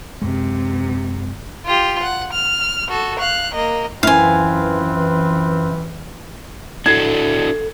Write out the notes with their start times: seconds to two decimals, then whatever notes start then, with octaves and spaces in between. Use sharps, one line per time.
0.21 F#2 C3 G#3
1.66 F4 G4
2.03 F#5
2.33 F6
2.89 F#4 A4
3.19 F5 F#6
3.54 A#3 D#5
4.03 F#2 E3 C4 E4 F4 B4 F5 G#5
6.86 D4 E4 F#4 A4 G#6 C7